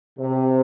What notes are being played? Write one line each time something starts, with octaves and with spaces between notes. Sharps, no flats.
C3